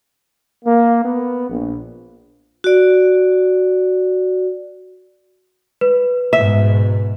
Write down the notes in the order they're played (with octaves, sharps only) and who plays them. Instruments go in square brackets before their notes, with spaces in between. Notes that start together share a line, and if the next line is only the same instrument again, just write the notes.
[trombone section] A#3
B3
A#1
[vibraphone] F#4 D5
[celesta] B4
[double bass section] G#2 B2 [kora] E5